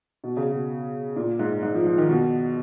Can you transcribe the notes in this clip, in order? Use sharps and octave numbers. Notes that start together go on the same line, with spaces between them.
B2
C#3
B2
A#2
G#2
G#2
F3
F3
D#3
B2